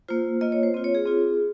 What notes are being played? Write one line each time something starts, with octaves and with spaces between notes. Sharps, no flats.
A#3 F4 C5
A#3 F4 D#5
C#5
C5
C4 F4
C#5
G#4
C4 F4